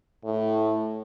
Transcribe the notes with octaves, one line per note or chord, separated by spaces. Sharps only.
A2